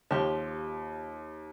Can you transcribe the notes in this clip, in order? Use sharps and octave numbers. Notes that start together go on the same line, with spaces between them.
D#2 F3 G4